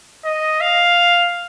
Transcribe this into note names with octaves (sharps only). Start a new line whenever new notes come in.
D#5
F5